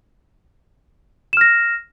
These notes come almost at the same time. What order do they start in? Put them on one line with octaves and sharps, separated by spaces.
E7 F6 A#6